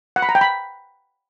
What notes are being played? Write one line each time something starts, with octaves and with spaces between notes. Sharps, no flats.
F#5
B5
A#5
G5
B5